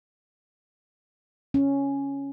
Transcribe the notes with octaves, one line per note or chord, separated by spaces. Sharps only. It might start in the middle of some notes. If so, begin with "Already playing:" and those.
C#4